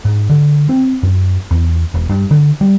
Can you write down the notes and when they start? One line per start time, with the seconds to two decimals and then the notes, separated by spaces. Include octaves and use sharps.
0.05 G#2
0.30 D3
0.69 C4
1.03 F#2
1.51 E2
1.94 E1
2.09 G2
2.31 D3
2.61 G3